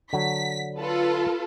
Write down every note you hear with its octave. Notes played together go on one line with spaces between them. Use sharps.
D3 F#3 B6
F4 A4 B4